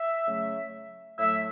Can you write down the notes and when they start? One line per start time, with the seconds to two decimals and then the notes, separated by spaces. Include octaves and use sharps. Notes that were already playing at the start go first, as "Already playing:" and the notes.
Already playing: E5
0.27 C#3 F#3 A3
1.19 A2 F#3 A3 E5